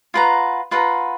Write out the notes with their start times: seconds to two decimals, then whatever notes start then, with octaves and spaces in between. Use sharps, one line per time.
0.14 F4 B4 F#5 A#5
0.71 F4 B4 F#5 A#5